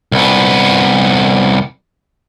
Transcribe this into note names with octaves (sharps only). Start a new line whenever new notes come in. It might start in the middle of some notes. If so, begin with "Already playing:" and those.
C2 B3